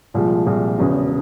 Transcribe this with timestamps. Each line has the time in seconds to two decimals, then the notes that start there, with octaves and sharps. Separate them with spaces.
0.14 C2 A#2 F3 G#3
0.46 C2 A#2 F3 G#3
0.78 E1 E2 C#3